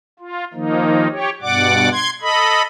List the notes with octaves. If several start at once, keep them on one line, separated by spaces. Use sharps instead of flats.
F4
D#3 F3 A#3 D#4
G4 C#5
G2 B2 D5 F#5 D6
C6 G#6
A4 D#5 B5